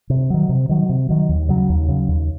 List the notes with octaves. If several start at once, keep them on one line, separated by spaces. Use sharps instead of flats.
C3
D#3 F#3
C3
D#3 F#3
C3
D#3 F#3
D#2
C#3 F#3
D#2
C#3 F#3
D#2